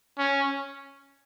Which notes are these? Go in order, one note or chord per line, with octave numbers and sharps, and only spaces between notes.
C#4